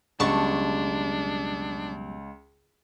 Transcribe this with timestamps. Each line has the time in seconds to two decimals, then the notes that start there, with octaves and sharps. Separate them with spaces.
0.20 C#2 F#2 B2 G3 D4 A5 C#6